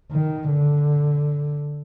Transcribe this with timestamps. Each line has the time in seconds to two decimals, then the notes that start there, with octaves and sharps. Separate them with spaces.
0.11 D#3
0.50 D3